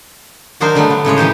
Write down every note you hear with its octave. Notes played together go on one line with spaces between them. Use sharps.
D#3 F#3 D4 D#4 A#4 C5
D3 F#3 G3 A3 B3 D4
D3
A2 C#3 G#3 C#5
E3 D#4 G4 C5